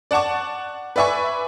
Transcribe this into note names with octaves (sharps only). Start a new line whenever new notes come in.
D5 F#5 A5 C#6 D6
B4 D5 E5 G#5 C#6